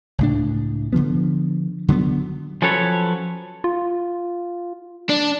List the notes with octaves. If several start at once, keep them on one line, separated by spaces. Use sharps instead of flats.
C#2 A2 D4
D3 E3 F3 B3
D3 F#3 G3 B3
F3 F#3 C#4 A4 B4 C#5
F4
D4